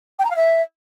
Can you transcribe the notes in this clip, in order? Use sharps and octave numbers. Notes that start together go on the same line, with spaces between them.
G5
A#5
F5
E5